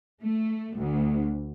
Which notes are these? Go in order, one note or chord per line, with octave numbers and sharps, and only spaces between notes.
A3
D2